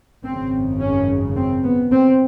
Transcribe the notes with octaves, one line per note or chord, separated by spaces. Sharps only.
G#1 F#2 C#3 C4
C#4
C4
B3
C4